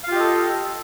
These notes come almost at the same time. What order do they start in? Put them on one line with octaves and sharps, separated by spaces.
F5 F4 G4 D#5 A4